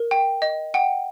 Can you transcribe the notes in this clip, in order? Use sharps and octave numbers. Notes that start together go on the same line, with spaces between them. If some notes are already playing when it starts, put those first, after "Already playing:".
Already playing: A#4
G5
D#5
F#5 G5